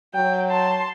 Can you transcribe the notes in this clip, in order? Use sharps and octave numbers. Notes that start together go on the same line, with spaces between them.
F#3 G5
A5 C6